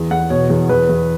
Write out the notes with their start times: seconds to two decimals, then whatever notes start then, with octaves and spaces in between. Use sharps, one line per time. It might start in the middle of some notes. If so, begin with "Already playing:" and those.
Already playing: E2
0.11 E2 F#5
0.30 B2 C#5
0.50 E2
0.69 E2 B4
0.89 E2